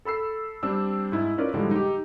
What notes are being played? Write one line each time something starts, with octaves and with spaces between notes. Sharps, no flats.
A4 B5 E6 C7
G3 C4 D4 E6
G#2 E4
C#4 D#4 F4 A#4 B4 D5
A2 D3 F3 G3 G#3
D#4 G4